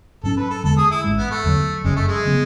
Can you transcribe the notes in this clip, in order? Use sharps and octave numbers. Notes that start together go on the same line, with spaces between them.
G#2 F#3 C#4 A4
B4
A4
E2 D3 G#3 A4
G#4
E4
A1 G#2 G#3
B3
A3
E2 D3 F#3
F#1 F#2 C#3 F#3 G#3
A3
G#3
C#3 F#3 B3